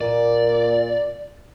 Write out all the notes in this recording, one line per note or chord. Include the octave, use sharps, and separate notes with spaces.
A#2 D5